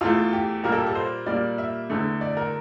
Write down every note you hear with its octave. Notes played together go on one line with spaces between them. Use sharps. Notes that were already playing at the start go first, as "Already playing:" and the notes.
E2 E3 A3 F4
G4
A#2 G3 A#3 A#4
A4
G4
A4
C5
A#2 G3 A#3 D5
E5
E2 D3 A3
D5
A#4